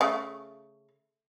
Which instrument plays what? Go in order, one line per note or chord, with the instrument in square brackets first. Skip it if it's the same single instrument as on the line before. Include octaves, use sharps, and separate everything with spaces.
[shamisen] C#3 A3